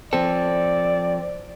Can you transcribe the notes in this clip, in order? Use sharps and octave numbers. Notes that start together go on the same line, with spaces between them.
F3 C4 A4 D5